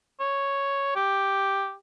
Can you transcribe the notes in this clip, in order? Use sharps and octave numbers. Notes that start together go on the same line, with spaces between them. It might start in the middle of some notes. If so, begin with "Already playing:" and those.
C#5
G4